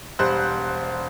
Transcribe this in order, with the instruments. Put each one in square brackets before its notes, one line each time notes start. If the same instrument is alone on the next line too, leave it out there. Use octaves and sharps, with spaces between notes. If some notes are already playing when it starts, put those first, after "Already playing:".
[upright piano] E1 G3 C5 F#6